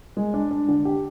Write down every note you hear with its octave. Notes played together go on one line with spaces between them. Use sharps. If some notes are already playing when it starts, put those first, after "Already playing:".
G#3
D4
D4
D3
G4